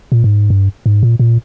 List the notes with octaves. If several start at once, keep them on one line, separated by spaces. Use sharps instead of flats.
A#2
G#2
G2
G#2
A#2
A#2